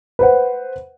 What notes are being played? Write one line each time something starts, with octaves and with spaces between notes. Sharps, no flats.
B4 C5 F#5